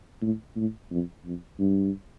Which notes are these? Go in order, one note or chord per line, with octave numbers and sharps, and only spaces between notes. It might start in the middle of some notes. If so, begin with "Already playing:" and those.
A2
A2
F2
F2
G2